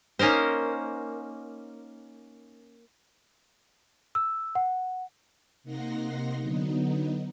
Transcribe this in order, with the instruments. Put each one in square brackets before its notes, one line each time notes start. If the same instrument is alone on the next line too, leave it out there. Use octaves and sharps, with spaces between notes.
[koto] A#3 C#4 D#4 A#4 C5
[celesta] E6
F#5
[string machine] C3 A#3 D#4 F#5 C6 A#6
D3 F#3 B3 D#4